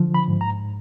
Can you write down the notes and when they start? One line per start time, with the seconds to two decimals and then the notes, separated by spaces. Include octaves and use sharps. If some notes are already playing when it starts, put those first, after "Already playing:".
Already playing: D3 F3
0.14 B5
0.28 G#2
0.41 A#5